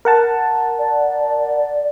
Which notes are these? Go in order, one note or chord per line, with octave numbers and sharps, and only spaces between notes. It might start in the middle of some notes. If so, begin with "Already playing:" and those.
A#4 F#5 A5
D5